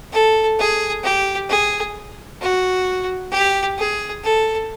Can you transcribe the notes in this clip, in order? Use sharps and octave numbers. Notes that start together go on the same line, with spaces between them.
A4
G#4
G4
G#4
F#4
G4
G#4
A4